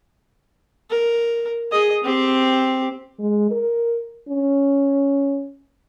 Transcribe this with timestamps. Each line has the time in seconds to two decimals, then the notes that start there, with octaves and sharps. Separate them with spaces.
0.90 A#4
1.72 G#4 D#5
2.04 C4 G4
3.20 G#3
3.51 A#4
4.29 C#4